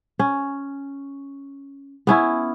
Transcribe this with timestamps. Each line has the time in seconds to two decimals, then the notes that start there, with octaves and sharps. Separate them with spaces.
0.19 C#4
2.07 B3 C#4 E4